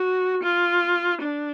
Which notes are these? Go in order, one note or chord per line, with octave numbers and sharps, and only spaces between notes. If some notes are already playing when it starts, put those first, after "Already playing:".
Already playing: F#4
F4
D4